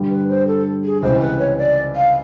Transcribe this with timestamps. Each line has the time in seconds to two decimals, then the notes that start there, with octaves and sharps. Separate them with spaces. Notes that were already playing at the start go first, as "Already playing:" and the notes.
Already playing: G2 D3 G3
0.10 B4
0.29 C5
0.48 A4
0.84 G#4
1.03 C#2 C3 E3 C5
1.21 B4
1.39 C#5
1.58 D5
1.96 F5